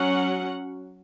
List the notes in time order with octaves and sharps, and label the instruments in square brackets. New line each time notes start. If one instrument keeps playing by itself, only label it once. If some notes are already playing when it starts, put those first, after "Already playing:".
Already playing: [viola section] F#3 C#4 F#5